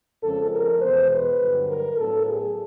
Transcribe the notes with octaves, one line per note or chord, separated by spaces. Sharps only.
F2 C#3 F3 G#3 C#4 A4
A#4
E2 B2 G#3 B3 C5
B4
G2 D3 F#3
A#4
A2 F#3 B3 A4
G#4